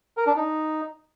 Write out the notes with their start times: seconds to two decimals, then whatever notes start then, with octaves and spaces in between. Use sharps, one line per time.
0.17 A#4
0.27 D4
0.36 D#4